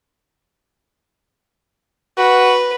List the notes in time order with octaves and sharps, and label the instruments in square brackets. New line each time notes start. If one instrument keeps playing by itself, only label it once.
[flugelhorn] F#4 [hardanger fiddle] B4